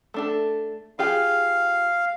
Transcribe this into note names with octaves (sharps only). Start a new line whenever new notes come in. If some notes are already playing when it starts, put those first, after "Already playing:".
A3 D4 A4
F4 G4 G#4 F5